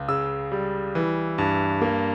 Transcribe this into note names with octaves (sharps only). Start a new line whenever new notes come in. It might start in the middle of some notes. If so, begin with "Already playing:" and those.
Already playing: C#2
C#3 E6
G3
E3
G2
A#3